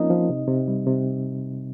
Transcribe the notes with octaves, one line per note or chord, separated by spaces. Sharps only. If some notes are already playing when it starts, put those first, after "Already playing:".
Already playing: F3 A#3 C4 C#4 D#4 F4 A#4 D#5
F3
C3
C3
G3
C3